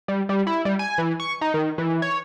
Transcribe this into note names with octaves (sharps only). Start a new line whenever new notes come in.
G3
G3
E4
G3
G#5
E3
C#6
D#4
D#3
E3
C#5